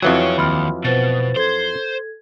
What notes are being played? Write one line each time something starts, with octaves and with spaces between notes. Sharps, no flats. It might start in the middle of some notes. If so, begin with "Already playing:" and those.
F2 E3 F#3 G#4 C#5
D#2 B5 C6 F6
B2 B4 C5 A6
A4 C5 G#6